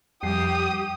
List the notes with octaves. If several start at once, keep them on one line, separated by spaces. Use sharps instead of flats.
F2 G3 G4 D#6 C7